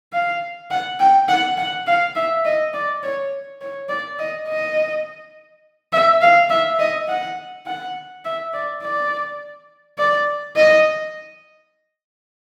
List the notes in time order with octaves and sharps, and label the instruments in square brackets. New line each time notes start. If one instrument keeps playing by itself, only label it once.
[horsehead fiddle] F5
F#5
G5
F#5
F#5
F5
E5
D#5
D5
C#5
C#5
D5
D#5
D#5
E5
F5
E5
D#5
F#5
F#5
E5
D5
D5
D5
D#5